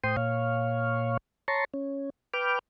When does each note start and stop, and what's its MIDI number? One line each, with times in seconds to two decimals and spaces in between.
0.04 0.16 45
0.04 0.16 72
0.04 0.16 79
0.04 0.16 84
0.04 0.16 87
0.17 1.17 46
0.17 1.17 73
0.17 1.17 77
1.48 1.65 73
1.48 1.65 81
1.48 1.65 82
1.48 1.65 84
1.48 1.65 85
1.74 2.10 61
2.34 2.59 71
2.34 2.59 79
2.34 2.59 86
2.34 2.59 89